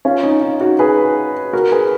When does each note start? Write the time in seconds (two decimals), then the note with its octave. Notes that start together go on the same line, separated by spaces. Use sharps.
0.05 C#4 F4
0.23 D#4
0.42 D#4
0.61 D#4 F#4
0.79 G#4 B4
1.53 F#4 A#4
1.71 G#4 B4